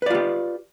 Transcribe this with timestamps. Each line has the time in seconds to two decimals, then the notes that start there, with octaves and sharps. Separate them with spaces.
0.02 B4
0.06 D5
0.10 F4
0.15 G4